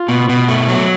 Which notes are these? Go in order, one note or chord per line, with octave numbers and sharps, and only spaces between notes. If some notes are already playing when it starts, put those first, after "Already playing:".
Already playing: F4
B2
B2
A3
F#3